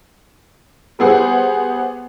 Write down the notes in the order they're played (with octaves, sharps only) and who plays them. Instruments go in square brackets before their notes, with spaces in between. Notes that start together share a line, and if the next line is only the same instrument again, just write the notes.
[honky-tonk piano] G3 B3 G#4 C5 F#5